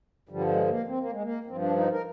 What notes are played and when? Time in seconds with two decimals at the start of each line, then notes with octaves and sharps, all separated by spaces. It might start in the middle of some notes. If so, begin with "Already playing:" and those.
0.29 G2 D3 F3 G3
0.48 G#3
0.68 A#3
0.87 C4
1.00 A#3
1.11 G#3
1.22 A#3
1.46 G2 F3 C4
1.61 D4
1.76 D#4
1.92 A#4